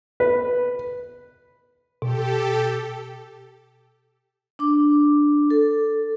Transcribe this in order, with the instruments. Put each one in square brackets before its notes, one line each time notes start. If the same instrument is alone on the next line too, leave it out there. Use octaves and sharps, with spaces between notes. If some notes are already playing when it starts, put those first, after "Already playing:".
[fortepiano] B4
[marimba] B2 [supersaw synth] G4 A4
[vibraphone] D4 D6
A4